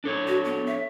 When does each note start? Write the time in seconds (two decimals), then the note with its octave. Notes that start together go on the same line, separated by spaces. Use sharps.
0.04 D4 A4 C#5
0.27 F#4
0.45 B3
0.67 E5